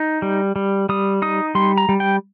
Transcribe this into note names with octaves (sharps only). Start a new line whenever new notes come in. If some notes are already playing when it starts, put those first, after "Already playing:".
Already playing: D#4
G3
G3
G3 D#6
D#4 D#6
G3 C6
A#5
G3
G5